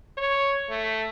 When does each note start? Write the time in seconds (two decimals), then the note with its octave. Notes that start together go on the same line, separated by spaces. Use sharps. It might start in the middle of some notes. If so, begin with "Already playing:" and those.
0.17 C#5
0.69 A3